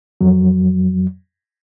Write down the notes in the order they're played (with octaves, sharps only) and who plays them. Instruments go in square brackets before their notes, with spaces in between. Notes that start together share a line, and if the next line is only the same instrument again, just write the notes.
[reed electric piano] F2 F#3